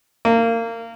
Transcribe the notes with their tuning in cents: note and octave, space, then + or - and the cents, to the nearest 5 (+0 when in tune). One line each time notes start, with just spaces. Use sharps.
A#3 -25